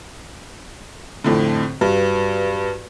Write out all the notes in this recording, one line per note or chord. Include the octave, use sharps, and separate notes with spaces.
F2 A2 D3 C4 C5
G2 F#4 G4 B4